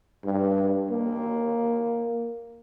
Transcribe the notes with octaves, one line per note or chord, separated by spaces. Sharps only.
G2
A#3